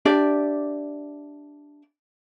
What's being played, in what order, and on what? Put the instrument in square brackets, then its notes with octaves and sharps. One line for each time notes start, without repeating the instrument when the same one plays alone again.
[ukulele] D4 G4 D5 E5